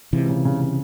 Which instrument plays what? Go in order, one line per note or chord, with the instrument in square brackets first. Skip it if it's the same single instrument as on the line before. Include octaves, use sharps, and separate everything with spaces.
[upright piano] C#2 [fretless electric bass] C3 E3
[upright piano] C#3
C#3
C#3